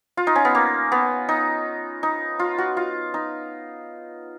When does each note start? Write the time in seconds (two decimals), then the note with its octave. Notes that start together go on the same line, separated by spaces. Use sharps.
0.17 F4
0.27 D#4
0.36 C#4
0.45 B3
0.55 A#3
0.92 B3
1.29 D#4
2.03 D#4
2.39 F4
2.58 F#4
2.77 F4
3.14 D#4